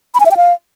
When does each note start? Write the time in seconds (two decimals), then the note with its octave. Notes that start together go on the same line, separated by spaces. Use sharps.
0.15 B5
0.20 G#5
0.26 E5
0.31 G5
0.37 F5